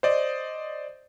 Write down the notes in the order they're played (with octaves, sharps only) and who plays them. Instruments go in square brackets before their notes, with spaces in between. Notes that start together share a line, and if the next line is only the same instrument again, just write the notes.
[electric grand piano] C5 D5 D#5